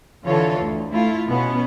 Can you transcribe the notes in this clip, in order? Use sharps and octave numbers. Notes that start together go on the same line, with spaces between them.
D3 E3 F4 A4 C#5
D2
A3 E4 F4
B2 B3 C#4